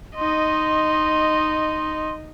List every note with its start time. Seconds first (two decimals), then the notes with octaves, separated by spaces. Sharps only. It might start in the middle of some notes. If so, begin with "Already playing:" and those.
0.16 D#4 D#5 C6